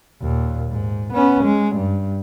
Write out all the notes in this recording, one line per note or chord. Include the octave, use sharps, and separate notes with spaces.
D#2 A#2
G#2
B3 C#4
G#3
G2